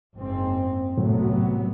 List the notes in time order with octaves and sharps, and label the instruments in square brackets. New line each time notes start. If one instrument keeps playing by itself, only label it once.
[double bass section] F#1 G#2 C4
[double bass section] C2 C3 B3 [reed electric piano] A2 [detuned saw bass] F#3